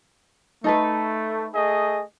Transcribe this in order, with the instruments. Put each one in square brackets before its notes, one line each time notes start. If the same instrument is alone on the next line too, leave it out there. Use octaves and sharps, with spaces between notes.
[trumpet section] A3 [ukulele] D#4 A4 B4
[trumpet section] A3 G#4 D#5